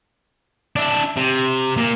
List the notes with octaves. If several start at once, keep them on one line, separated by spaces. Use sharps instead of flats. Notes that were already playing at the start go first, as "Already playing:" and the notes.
D4 E4
C3
A#2